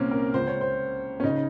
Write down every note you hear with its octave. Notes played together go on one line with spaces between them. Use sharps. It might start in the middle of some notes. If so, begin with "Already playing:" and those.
Already playing: C2 A#2 A#3 C4 C#4
A#4
C#2 C#3 C5
C#5
C5
C#4
C#3 D#4